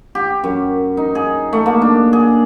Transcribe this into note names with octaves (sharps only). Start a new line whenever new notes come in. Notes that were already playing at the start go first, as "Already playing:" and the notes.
G4
F#2
D#4
G#4
A3
A#3
D4
G#4